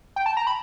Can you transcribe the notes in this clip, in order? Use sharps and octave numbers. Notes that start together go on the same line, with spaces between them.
G5
A5
A#5
B5